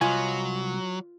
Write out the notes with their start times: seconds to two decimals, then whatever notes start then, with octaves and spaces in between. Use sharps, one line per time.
0.01 C2 F#3 F4 B4 D#5 G#5